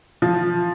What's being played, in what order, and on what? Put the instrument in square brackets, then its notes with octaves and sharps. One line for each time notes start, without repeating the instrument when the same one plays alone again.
[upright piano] F3